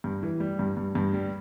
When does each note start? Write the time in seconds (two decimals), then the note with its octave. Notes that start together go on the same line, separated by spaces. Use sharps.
0.04 G2
0.23 E3
0.40 G3
0.59 G2
0.77 G2
0.95 G2
1.14 G3